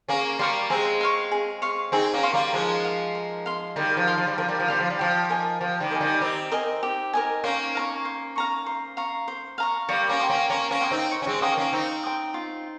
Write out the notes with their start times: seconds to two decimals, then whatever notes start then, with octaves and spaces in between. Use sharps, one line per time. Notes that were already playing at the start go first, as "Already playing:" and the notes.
0.08 A#3 C#4 G#4
0.39 G3 A#3 C#5 F5 C6
0.70 G#3 C4 G#4
1.01 C#5 F5 C6
1.31 G#4
1.62 C#5 F5 C6
1.92 C4 D#4 G#4
2.14 A#3 C#4
2.23 C#5 F5 C6
2.33 G3 A#3
2.53 F3 G#3 A#4
2.85 F5 C6
3.15 A#4
3.46 F5 C6
3.76 D#3 G3 A#4
3.97 F3
4.07 F5 C6
4.17 F3
4.27 G3
4.38 F3 A#4
4.48 G3
4.60 F3
4.68 G3 F5 C6
4.80 F3
4.90 G3
4.99 F3 G4
5.29 A#4 D#5 G#5
5.60 F3 G4
5.80 D#3 G3
5.91 A#4 D#5 G#5
6.01 D#3 G3
6.21 C4 D#4 G4
6.52 A#4 D#5 G#5
6.83 G4
7.13 A#4 D#5 G#5
7.44 A#3 C#4 C5
7.75 F5 A#5 C#6
8.05 C5
8.36 F5 A#5 C#6
8.66 C5
8.97 F5 A#5 C#6
9.28 C5
9.58 F5 A#5 C#6
9.89 G3 A#3 C#5
10.09 A#3 C#4
10.20 G5 C6 D#6
10.30 A#3 C#4
10.50 A#3 C#4 C#5
10.71 A#3 C#4
10.81 G5 C6 D#6
10.91 C4 D#4
11.11 C#5
11.22 C#4
11.27 G#3 C4
11.42 A#3 C#4 G5 C6 D#6
11.57 A#3 C#4
11.73 C4 D#4 C#5
12.03 G5 C6 D#6
12.34 F4